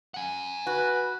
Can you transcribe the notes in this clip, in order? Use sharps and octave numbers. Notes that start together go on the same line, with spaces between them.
F#5 G#5
F#4 B4